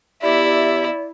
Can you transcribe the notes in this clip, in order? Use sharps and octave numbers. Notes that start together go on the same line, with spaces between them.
E2 E4 G4 D5 E5